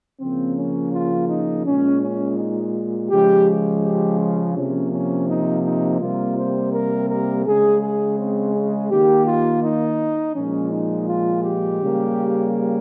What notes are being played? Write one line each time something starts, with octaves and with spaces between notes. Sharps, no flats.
C#3 F3 A#3 C4
C#4
F4
D#4
A#2 G#3 C#4
C#4
D#4
C#3 F3 G#3 G4
G4
F4
C3 F3 A#3 C#4
C#4
D#4
D#4
C3 G3 A#3 F4
C5
A#4
A#4
C#3 G#3 G#4
G#4
C4
G#4
D#3 A#3 G4
F4
D#4
A#2 F3 G#3 C#4
D#4
F4
G4
C#3 G3 A#3